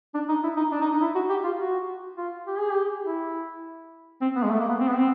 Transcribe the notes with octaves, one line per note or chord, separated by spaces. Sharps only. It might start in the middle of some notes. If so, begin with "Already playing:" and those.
D4
D#4
E4
D#4
D4
D#4
D#4
E4
F#4
G4
F4
F#4
F4
G4
G#4
G4
E4
C4
B3
G#3
A3
A#3
B3
C4
B3
C4